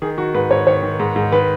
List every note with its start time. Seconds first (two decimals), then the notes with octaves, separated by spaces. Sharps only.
0.02 D#3 G#4
0.18 D#3 F#4
0.34 G#2 B4
0.51 G#2 C#5
0.67 D#3 C#5
0.83 D#3
0.99 G#2
1.16 G#2
1.32 D#3 B4